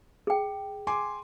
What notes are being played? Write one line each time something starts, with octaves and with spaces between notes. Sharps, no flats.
G#4 G5
G#5 C6 D6